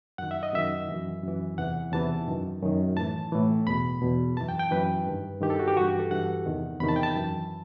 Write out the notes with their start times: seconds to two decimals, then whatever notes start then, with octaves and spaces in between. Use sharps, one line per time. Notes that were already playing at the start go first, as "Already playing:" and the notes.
0.18 F#2 D#3 F#5
0.31 E5
0.43 D#5
0.53 F#2 D#3 E5
0.88 F#2 E3
1.23 F#2 E3
1.58 E2 C3 E3 F#5
1.93 E2 C3 E3 A5
2.28 F#2 D#3
2.63 F#2 D#3
2.97 A2 E3 A5
3.32 A2 E3
3.67 E2 B2 B5
4.02 E2 B2
4.37 F#2 E3 A5
4.49 G5
4.59 G5
4.71 F#2 E3 B4
5.07 G2 D#3
5.41 G2 D#3 G4
5.50 A4
5.59 F#4
5.68 G4
5.77 E3 F#4
5.81 G2
5.88 G4
5.99 A4
6.11 G2 E3 F#5
6.46 E2 C3 D#3
6.80 E2 C3 D#3 B5
6.89 A5
6.96 G5
7.03 A5
7.16 F#2 E3